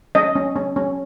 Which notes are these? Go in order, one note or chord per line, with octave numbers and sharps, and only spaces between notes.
C#4 D#5
C#4
C#4
C#4